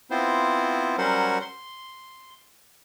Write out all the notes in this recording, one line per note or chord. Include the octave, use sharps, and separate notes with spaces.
B3 C4 E4 F4 C5
F#3 G3 C#4 A#4 C5 F#5
C6